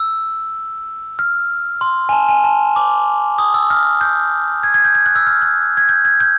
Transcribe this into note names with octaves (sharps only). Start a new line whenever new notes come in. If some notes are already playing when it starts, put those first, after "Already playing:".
Already playing: E6
F6
C6
G#5
A5
G#5
A5
D6
D#6
E6
F6
G6
G#6
G#6
G6
G#6
F#6
E6
F6
F#6
G#6
G6
G#6
G6